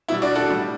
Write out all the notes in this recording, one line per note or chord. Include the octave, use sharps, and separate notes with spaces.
B2 G3 E4
D4 F#4
F#4 A4
A2 G3